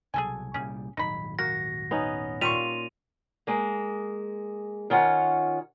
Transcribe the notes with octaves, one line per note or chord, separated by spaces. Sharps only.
C2 B2 F#3 G#4 A4 G#5
C2 A#2 G3 C#4 G#4
D#1 G#1 F#3 D#4 B5
A#3 F#4 A#6
B3 C#4 D#4
A#2 G3 F4 A#4 C#6 D#7 F7
G#3 A#3
D#3 C#4 F4 F#5